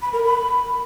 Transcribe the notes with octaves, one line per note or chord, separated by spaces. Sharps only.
B5
A#4
B5